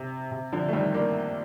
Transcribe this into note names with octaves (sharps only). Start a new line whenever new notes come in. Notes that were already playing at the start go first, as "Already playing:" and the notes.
Already playing: C3
C3
D3 F3
A3
D#3 G3
A#3 D4